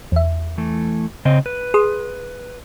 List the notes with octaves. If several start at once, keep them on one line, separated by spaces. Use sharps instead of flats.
E2 E5
E3 A3
C#3 C4 D#5
B4
G#4 C6 D#6